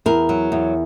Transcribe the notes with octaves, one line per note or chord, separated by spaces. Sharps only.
E2 A#4
F#3
E2